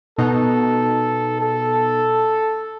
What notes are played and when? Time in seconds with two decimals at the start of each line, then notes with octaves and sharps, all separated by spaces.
0.18 B2 D#4 A4
1.41 A4